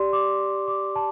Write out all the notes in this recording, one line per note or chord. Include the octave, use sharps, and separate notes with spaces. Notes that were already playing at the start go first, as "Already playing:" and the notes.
Already playing: G4 D5 C6
D6
D6
A5